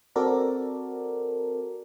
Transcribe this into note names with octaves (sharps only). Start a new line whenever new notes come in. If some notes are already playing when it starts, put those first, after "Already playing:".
C4 F#4 A4 A#4 D5